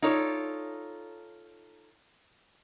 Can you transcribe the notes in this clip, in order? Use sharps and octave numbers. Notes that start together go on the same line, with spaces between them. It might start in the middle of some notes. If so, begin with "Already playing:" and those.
D#4 F4 A4 C#5 D5